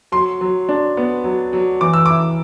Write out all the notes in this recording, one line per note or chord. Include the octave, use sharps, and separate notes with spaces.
F#3 C6
F#3
D4
B3
F#3
F#3
E3 D6
E6
E4 D6